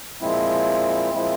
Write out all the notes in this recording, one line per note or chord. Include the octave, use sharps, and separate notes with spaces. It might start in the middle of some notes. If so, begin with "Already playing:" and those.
A#2 F3 G#3 C4 E4
A#2 F3 G#3 C4 E4